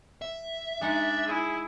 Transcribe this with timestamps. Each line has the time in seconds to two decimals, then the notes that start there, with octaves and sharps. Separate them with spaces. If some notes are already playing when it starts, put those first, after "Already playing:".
0.22 E5
0.81 G#3 D4 D#4 F#5
1.26 E4 G#4